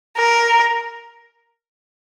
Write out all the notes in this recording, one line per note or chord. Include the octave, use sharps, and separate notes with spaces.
A#4